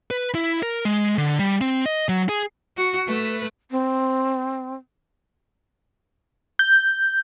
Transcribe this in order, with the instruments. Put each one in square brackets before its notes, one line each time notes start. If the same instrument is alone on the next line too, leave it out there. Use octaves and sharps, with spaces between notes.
[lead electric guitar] B4
E4
A#4
G#3
D3
G3
C4
D#5
F#3
G#4
[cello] F#4
A3 B4
[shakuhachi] C4
[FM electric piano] G6